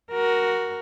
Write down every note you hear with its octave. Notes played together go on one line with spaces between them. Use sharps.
F#4 A#4